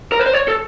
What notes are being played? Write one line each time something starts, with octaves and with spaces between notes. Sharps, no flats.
A#4
B4
C5
C#5
A4